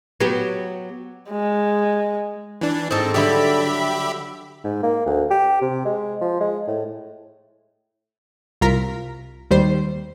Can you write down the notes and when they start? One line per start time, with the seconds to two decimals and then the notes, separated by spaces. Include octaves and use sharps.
0.20 F#3 B3 G4
1.30 G#3
2.61 E3 D4
2.91 G#2 C4 A4
3.14 D3 F#3 G3 G4 E5 B5
4.64 G#2
4.83 A#3
5.06 D2
5.30 G4
5.62 C3
5.85 G#3
6.21 F3
6.40 G#3
6.68 A2
8.61 C2 F4 A#4 A#5 B6
9.50 D#2 G3 C5 C7